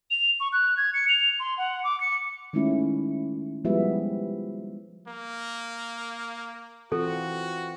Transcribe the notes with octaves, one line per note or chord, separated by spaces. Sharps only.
F7
C#6
F#6
G#6
C#7
F7
C6
F#5
D6
C#7
D#3 G#3 A3 C#4 E4
F3 G3 G#3 B3 E4 E5
A#3
E3 C4 F4 F#4 A4